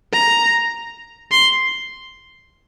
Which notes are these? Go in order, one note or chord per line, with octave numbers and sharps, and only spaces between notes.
A#5
C6